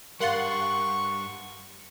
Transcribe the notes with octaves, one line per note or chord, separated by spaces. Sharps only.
G2 G3 A#4 F5 F#5 C6 C#6 A6